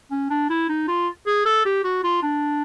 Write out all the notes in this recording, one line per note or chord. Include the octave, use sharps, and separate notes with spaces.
C#4
D4
E4
D#4
F4
G#4
A4
G4
F#4
F4
D4